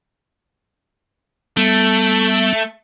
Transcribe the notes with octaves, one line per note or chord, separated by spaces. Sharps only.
G3 A3 B3